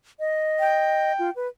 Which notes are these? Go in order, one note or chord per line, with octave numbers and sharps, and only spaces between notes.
D#5
G5
F4
B4